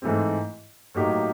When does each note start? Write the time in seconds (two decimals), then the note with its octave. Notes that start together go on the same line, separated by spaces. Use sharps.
0.02 G#2 E3 A3 C4
0.94 A2 F#3 A#3 D#4 G4